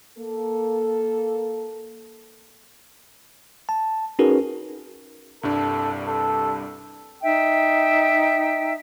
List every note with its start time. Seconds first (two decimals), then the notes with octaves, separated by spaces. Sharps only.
0.18 A#3 A4
3.69 A5
4.19 C#4 D#4 F#4 G#4 A#4 B4
5.43 C2 G2 D4 A4
6.06 A4
7.21 D#4 E5 G5